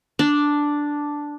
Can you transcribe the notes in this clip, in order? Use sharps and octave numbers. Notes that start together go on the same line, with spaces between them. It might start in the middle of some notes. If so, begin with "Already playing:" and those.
D4